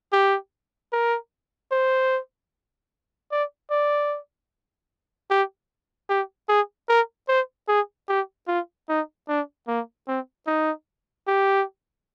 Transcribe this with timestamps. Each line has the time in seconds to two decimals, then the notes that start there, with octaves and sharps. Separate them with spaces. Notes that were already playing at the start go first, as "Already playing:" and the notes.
0.13 G4
0.93 A#4
1.72 C5
3.32 D5
3.70 D5
5.30 G4
6.10 G4
6.49 G#4
6.89 A#4
7.28 C5
7.68 G#4
8.09 G4
8.48 F4
8.89 D#4
9.28 D4
9.68 A#3
10.08 C4
10.47 D#4
11.27 G4